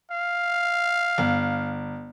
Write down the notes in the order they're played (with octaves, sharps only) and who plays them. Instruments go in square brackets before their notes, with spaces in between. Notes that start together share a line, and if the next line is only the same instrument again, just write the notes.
[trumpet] F5
[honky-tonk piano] G1